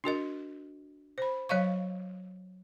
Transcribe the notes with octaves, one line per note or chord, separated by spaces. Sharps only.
D4 F#4 A#4 D#5
C5 B5
F#3 C#5 D#5 F5 C#6